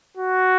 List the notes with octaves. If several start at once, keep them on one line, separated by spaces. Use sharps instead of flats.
F#4